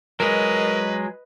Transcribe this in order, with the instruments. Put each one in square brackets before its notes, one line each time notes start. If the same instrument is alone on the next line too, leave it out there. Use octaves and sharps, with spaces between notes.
[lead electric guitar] F#3 G#3 [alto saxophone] A#4 [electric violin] B4 [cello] D#5